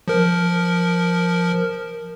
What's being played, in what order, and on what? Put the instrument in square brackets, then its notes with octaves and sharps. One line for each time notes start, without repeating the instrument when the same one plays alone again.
[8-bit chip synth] F3 A#4